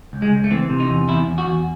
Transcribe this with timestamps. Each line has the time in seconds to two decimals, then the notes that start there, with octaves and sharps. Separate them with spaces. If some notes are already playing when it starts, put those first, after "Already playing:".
0.13 C#2
0.22 G#3
0.32 C#2
0.44 A3
0.51 E3 C4
0.70 C3
0.80 D#4
0.90 E2
1.09 E2 E4
1.27 E2
1.38 F#4
1.47 E2